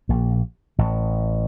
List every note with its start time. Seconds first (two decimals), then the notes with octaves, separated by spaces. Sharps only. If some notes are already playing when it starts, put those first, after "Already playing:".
0.09 A#1 A#2
0.79 A1 A2